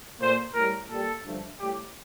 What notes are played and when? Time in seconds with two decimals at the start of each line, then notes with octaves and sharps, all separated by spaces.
0.19 A#2 A3 C5
0.54 A2 G3 A#4
0.89 A#2 G3 A4
1.23 G2 D3 F3 A3
1.58 A2 G3 G4